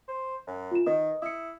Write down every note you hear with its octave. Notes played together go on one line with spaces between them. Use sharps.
C5
F#2
F4 E7
D#3 B4 D#5 D#6
E4 D#6 C#7